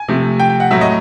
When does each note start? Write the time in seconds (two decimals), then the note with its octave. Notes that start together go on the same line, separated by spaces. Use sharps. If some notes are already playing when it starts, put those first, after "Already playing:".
Already playing: G#5
0.08 C3 F3 A3
0.40 G5
0.50 G5
0.60 F#5
0.71 A2 F#3 A3 E5
0.81 D#5